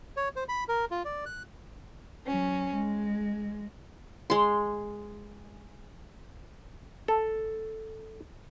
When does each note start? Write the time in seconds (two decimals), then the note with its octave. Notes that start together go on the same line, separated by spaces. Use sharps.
0.17 C#5
0.36 C5
0.49 B5
0.68 A#4
0.91 F4
1.05 D5
1.26 F#6
2.26 F#3 C#4
2.74 G#3
4.30 G#3 C6
7.08 A4